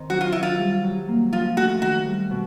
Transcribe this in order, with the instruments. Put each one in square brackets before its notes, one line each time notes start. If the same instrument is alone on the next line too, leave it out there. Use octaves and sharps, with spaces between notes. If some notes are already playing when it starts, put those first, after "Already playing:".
Already playing: [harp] D#3 C4
[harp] F#3 [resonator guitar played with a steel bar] F#4
[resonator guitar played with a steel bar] F4
[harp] D#3 [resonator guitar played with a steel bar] E4
[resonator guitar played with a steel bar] F4
[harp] G3
F#3
A#3
[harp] F3 [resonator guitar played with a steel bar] F4
[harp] A3 [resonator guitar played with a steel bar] F#4
[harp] D#3 [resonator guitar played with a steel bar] F#4
[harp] G3
B2